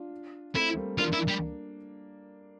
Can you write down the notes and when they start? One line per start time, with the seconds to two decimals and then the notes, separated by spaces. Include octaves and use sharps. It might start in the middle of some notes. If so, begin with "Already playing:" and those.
Already playing: D4 F4
0.55 A3 C4 E4
0.77 G3 A#3
0.98 A#3 D4 F4
1.13 E4
1.28 G3